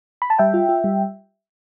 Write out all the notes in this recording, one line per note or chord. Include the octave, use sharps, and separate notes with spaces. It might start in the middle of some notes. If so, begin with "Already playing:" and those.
B5
A5
G3 E5 G5
F4
F4
G3